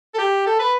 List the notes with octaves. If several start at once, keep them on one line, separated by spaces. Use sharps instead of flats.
A4
G4
A4
B4